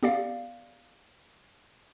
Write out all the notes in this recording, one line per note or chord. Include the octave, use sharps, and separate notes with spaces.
B3 G4 D5 F5